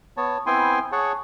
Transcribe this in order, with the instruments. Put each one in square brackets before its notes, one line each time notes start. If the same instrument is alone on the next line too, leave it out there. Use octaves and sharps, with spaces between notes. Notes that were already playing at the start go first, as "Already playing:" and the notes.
[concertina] B3 C#5 A5
B3 C4 E4 G5 G#5 C6
G#4 C#5 F#5 A5 C#6